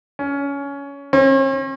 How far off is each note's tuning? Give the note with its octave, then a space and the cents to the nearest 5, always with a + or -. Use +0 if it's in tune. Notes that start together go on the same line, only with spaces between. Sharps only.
C#4 +20
C#4 -45